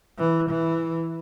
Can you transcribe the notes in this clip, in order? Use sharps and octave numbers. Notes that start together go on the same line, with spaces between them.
E3
E3